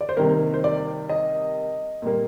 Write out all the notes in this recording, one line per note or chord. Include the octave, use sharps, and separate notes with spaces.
D5
C5
C3 D#3 G3 A#3 A#4
C5
D5
D#5
A#2 G3 A#3